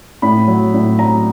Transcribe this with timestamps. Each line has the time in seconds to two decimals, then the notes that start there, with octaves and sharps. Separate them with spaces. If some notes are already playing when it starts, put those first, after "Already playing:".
0.22 A2 B5
0.48 F#3
0.74 A2
0.99 F#3 A#5